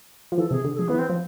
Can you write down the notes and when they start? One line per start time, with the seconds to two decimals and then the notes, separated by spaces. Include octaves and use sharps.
0.32 F3
0.37 E3 A4
0.51 C3 G#4
0.64 D3
0.74 A4
0.78 F3 G#4
0.88 E3 B3
0.99 C4
1.10 F3